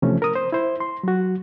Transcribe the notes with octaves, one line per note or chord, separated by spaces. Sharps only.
C3 E3 F3 A3 C#4
A#4 D#6
C5
E4 C5
C6
F#3 F#4